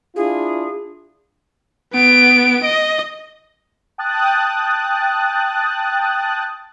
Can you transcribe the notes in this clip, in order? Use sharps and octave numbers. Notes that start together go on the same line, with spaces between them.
D4 E4 F4 G#4
B3 D7
D#5
G5 A5 D#6 F#6 A6